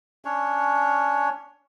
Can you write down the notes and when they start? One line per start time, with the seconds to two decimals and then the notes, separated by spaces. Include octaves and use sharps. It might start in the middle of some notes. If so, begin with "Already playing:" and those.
0.25 C#4 D4 C#5